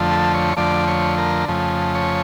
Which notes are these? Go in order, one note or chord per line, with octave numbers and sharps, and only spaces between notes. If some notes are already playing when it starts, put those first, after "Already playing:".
Already playing: F2 D3 F3 A3
A4
C#5
F2 D3 F3 A3 D5
C#5
A#4
F2 C#3 F3 A3
C#5